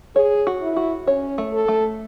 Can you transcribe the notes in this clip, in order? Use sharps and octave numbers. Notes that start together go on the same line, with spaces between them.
G#4 C#5
F#4
E4
F#4
C#4 C#5
A3
A4
A3